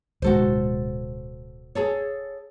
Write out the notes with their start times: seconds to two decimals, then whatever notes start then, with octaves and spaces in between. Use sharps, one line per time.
0.22 D1 B1 G#3 F#4 A4 C5
1.75 G#4 A4 C#5